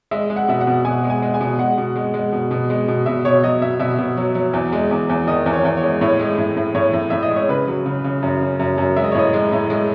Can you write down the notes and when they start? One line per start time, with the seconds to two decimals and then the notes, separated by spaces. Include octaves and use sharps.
0.11 G#3 E5
0.30 G#3
0.36 F#5
0.48 B2 E5
0.61 F#5
0.67 B2
0.85 B2 G#5
1.04 G#3
1.10 G#5
1.22 G#3
1.34 G#5
1.41 B2
1.59 G#3 F#5
1.78 B2
1.96 G#3
2.14 G#3
2.33 B2
2.51 B2
2.70 G#3
2.88 B2
3.06 B2 E5
3.25 B2 C#5
3.43 F#3 D#5
3.61 B2 E5
3.80 B2 E5
3.98 B2
4.17 F#3
4.35 F#3
4.54 E2
4.72 G#3
4.91 E2
5.09 E2
5.28 D#3 D#5
5.46 E2
5.53 C#5
5.65 E2
5.77 C#5
5.83 G#3
6.01 A2 C#5
6.19 G#3
6.38 A2
6.57 A2
6.75 A2 C#5
6.93 A2
7.10 A2 E5
7.23 D#5
7.30 G#3
7.36 C#5
7.49 C#3 B4
7.68 F#3
7.86 C#3
8.04 C#3
8.23 F#2
8.41 C#3
8.59 F#2
8.78 F#2
8.96 G#3 E5
9.04 D#5
9.12 C#5
9.15 A2 D#5
9.33 G#3
9.52 A2
9.70 G#3